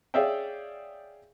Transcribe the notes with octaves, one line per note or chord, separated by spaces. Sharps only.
G#4 C#5 D5 E5 F5 G5